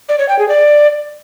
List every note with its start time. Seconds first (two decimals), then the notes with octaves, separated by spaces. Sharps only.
0.09 D5
0.19 C#5
0.29 G5
0.39 G#4
0.49 D5